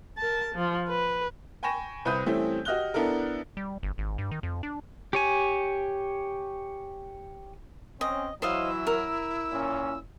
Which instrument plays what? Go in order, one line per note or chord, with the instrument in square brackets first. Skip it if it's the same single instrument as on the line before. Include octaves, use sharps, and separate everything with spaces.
[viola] A#4 A5
F3
B4
[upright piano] G5 G#5 B5 C#6 A#6 E7
C2 C4 B4 B5 D#6 G6
E3 G3 A3 C4 C#4 E4
F#4 G4 D#5 F6 F#6 G7
B3 D4 E4 A4 A#4
[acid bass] G3
G1
G#1
G2
D#3
F2
D4
[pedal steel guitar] G4 C#5 G#5
[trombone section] C4 C#4 [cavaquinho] D#5
[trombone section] E3 F#3 [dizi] E4 [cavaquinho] C5 D#5 F5 [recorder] E6
[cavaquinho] A#4
[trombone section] A#2 C#4